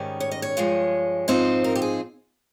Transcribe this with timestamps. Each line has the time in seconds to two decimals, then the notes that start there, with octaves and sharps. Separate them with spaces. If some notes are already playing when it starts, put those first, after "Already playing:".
Already playing: G#2 D#3 G3 C#4
0.20 C#5
0.31 D#5
0.42 C#5
0.57 G2 F3 G#3
1.28 G#2 F3 C4 D#4 C5
1.64 A#4
1.76 G4
1.82 G#4